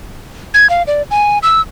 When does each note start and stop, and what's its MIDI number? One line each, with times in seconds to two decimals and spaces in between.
0.54 0.69 92
0.70 0.83 77
0.87 1.02 74
1.11 1.39 80
1.43 1.61 88